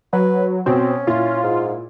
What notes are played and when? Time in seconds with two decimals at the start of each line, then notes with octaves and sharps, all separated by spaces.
0.13 F#3 B4
0.66 B2 C4 C#4
1.07 A#2 E4 F4
1.44 G#2